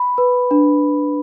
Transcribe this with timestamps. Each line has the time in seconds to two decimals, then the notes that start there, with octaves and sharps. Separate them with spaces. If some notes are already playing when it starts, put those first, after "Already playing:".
Already playing: B5
0.18 B4
0.51 D4